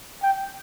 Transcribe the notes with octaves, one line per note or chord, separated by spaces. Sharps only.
G5